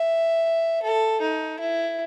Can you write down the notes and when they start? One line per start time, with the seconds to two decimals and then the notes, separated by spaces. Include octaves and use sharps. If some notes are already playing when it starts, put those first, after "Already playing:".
Already playing: E5
0.82 A4
1.21 D#4
1.60 E4